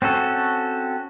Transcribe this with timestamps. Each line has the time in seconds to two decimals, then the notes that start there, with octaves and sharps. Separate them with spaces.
0.02 C4 C#4 F#4 A4